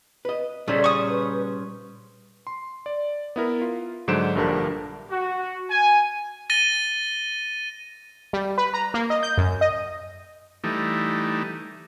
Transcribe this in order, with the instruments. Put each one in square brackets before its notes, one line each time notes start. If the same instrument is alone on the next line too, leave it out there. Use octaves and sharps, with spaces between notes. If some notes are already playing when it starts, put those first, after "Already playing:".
[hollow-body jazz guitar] B4 D#5
[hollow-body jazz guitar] A#2 C#3 D#4 [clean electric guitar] G3 C#4 C5 [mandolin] A3 [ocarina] D5
[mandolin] C#6 D#6
[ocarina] B4
[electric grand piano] C6
D5
B3 E4 A#4
F4
G#2 D3 F#3 C5 D7 E7
A#1 G2 D3 G4 A#4 A5
[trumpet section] F#4
G#5
[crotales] A6 A#6 D#7 G7
[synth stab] G3
B4
A#5
A#3
D#5
G6
F#2
D#5
[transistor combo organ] E3 G3 A3 D#4